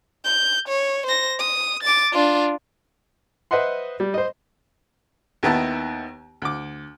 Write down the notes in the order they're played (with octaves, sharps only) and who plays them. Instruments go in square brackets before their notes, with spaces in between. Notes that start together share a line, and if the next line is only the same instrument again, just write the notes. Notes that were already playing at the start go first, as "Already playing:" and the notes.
[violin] G6
C#5
C5 A#6
D#6
D6 A6
D4 F4
[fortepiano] B4 C5 D#5 E5 F#5 C6
G3
C5 D#5
D#2 D#3 B3 E4 A5
D2 D6